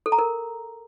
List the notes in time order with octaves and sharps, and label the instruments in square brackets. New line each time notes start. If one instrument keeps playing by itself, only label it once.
[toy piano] A4
A#5
A#4